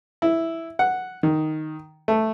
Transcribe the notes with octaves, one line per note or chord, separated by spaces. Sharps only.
E4
F#5
D#3
A3